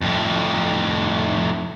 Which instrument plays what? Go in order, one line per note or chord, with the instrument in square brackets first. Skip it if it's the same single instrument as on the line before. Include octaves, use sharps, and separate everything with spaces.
[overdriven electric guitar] F2 A2